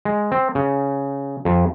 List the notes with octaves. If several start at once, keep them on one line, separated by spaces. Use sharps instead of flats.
G#3
C4
C#3
F2